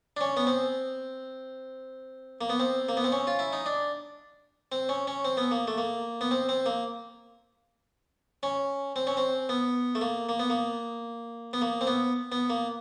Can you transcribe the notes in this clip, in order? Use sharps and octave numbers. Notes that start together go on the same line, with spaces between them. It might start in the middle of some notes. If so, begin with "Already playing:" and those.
D4
C#4
B3
C4
A#3
B3
C4
A#3
B3
C4
C#4
F4
E4
D#4
D4
C4
C#4
C#4
C4
B3
A#3
A3
A#3
B3
C4
C4
A#3
C#4
C4
C#4
C4
B3
A3
A#3
A#3
B3
A#3
B3
A#3
C4
B3
B3
A#3